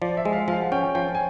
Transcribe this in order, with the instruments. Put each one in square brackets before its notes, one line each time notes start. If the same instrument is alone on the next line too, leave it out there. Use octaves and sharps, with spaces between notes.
[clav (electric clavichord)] F3 [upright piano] D5
[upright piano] E5
[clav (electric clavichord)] G#3
[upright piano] F5
[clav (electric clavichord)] F3 [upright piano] F5
[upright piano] F#5
[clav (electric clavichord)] C#4 [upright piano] G5
[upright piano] G5
[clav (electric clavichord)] F3 [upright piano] G5
[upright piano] G#5